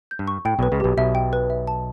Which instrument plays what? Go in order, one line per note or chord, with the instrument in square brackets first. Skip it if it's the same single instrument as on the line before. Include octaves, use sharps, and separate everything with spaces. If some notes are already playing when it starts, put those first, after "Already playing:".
[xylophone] G6
[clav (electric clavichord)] G2
[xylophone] C#6
[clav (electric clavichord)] A2 [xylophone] G5
[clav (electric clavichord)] B1 B2 [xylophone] B4
[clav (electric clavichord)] C#2 C#3
[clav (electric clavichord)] B1 B2 [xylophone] G4
[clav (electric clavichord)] B1 B2 [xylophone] E5
[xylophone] G5
B4
E5
A5